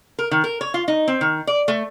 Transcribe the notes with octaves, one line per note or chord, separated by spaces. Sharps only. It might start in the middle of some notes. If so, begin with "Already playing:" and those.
A#4
D#3
A#4
C#5
F4
D#4
C4
D#3
D5
A3